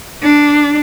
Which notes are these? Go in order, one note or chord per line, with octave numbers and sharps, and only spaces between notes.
D4